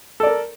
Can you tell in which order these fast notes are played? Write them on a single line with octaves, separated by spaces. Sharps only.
A4 D5 A#4